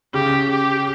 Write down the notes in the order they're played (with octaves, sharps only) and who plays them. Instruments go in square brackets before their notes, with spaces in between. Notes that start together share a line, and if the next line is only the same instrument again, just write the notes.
[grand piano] C#3 [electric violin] G4
[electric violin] G4